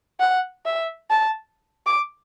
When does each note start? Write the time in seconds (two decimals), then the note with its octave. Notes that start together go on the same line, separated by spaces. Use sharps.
0.20 F#5
0.65 E5
1.10 A5
1.86 D6